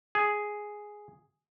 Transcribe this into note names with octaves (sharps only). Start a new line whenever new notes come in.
G#4